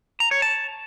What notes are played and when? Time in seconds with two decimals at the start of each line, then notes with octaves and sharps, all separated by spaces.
0.20 A#5
0.31 C#5
0.42 A5